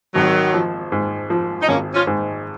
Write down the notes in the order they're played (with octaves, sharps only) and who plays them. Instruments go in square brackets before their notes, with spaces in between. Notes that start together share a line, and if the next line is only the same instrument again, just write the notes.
[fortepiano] G#1 [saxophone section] D#3 F#3
[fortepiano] F3
G#2
F3
[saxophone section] D#4
[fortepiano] G#1 [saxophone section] A#3 C#4
[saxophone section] C#4 F4
[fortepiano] G#2